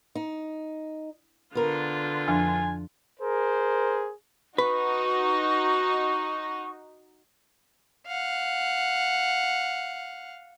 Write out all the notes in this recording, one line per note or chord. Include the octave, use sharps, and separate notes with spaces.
D#4
D3 B3 F4 A#4
F2 F3 D4 G#5
G#4 A#4 C5
D#4 F#4 B4 C#6
F5 F#5